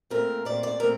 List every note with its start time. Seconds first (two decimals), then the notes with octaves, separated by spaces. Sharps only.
0.10 A#2 A3 C4 A#4
0.45 A#2 A3 C4 D5
0.63 D5
0.80 A#2 A3 C4 A#4